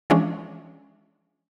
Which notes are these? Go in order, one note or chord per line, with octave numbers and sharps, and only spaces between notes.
E3 F3 G#3 C#4 D4